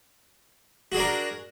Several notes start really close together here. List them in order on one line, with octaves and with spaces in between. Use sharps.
F#4 G#4 D4 A#4